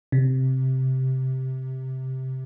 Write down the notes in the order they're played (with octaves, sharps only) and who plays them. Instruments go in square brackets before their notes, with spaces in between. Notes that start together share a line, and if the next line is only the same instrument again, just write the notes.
[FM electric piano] C3